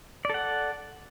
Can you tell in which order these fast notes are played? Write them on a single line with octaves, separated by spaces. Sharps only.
D5 A4 F#5